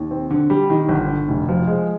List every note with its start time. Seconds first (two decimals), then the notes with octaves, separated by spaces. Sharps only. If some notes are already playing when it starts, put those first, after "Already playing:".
Already playing: D#2
0.11 C4
0.30 D3
0.50 G3
0.70 D#3
0.88 G1
1.08 D3
1.28 F1
1.48 F3
1.67 G#3